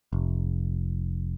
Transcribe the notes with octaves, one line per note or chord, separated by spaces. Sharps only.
F1